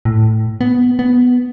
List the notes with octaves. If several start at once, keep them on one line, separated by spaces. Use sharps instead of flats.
A2
B3
B3